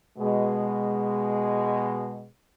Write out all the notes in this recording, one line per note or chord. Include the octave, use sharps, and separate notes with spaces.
B2 G#3